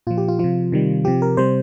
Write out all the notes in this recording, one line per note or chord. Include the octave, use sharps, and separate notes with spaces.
A#2 F3 F4
G4
F4
C3 F3 F4
C3 D#3 G3
C3 F3 G4
A#4
C3 G3 C5